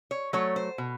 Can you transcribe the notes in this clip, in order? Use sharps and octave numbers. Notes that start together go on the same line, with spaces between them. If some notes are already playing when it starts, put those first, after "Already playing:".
C#5
F#3 A3 C#5
C5
B2